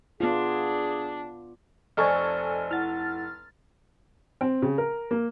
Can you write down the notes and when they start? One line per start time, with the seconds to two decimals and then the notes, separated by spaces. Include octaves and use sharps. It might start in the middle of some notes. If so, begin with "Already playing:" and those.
0.20 B3 D4 F4 G#4
1.97 F1 A4 C5 D5 D#5 G#5 C#6 F6
2.71 E4 F#5 F6 A6
4.41 C4
4.62 C#3
4.78 A#4
5.11 A#3